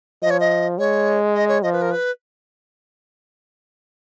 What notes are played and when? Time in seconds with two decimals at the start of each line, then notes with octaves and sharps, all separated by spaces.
0.22 F3 D#5
0.30 C#5
0.40 D#5
0.78 G#3 C#5
1.35 D#5
1.48 C#5
1.63 F3 D#5
1.72 B4
1.82 A#4
1.91 B4